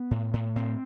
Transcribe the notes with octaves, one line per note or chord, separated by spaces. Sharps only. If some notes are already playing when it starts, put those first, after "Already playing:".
Already playing: B3
A2
A2
A2 C4